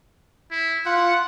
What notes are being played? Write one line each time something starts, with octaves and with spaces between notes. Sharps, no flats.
E4
F4 F#5